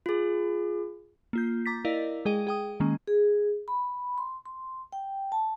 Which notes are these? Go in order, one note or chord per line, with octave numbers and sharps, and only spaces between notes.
F4 G#4
A#3 F4 G6
A#5 D6 A6 B6
E4 A#4 D5 D#5 F5
G#3 G#4 D#5 G5 D#7
G#4 G5 D#6
D#3 G#3 A#3 C#4
G#4
B5
C6
C6
G5
A5